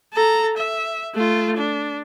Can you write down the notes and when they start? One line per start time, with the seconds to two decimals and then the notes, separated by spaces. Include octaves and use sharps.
0.14 A4 A#5
0.57 E5
1.15 A3 F4
1.57 D4